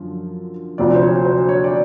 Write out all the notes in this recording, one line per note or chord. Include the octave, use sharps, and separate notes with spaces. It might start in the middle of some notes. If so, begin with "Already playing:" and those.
Already playing: F#2 D3 F3
D2 C3 F3 D5
C5
C#5
C5
C#5
D5